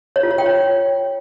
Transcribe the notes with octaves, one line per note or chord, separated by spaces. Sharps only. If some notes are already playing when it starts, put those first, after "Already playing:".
C#5
F4
C#5
G5
C#5